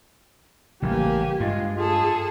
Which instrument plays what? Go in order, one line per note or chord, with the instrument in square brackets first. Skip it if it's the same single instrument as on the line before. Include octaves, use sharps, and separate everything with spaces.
[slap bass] A1 C#3 G3 [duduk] A#3 [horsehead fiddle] G4 G#5
[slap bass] G2 [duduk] G#3 [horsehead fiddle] F4
[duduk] F4 [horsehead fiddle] G#4 A4